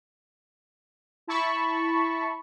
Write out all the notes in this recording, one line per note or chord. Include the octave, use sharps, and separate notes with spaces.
E4 A5 B5 C#6